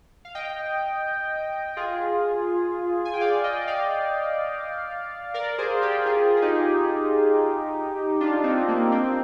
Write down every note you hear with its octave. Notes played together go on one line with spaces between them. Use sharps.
F5
D#5 G5
F4 G#4
G#5
G5
D5 F5
D#5 G5
D5 F5
A#4 D5
G#4 C5
G4 A#4
F4 G#4
G#4
D#4 G4
D4 F4
C4 D#4
A#3
C4